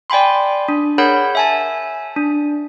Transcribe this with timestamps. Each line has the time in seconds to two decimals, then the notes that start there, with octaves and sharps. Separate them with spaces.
0.10 D5 G5 G#5 B5 C6
0.68 D4
0.98 G#4 A#4 C#5 F#5 B5 G6
1.35 E5 G#5 A5
2.16 D4